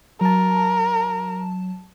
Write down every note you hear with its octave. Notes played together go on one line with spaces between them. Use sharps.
F#3 A#4 A5